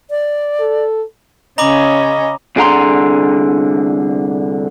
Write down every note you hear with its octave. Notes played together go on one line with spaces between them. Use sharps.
D5
A4
C#3 C#4 D#5 A#5 B5 D6
C2 D3 G#4 F#5 A#5 C6